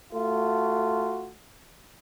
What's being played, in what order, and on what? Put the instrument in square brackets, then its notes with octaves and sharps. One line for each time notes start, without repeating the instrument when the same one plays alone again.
[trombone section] A3 F4 F#4